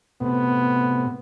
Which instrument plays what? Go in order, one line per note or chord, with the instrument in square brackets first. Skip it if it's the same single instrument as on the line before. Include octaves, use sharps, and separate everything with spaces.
[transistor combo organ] A2 C3 [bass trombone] B3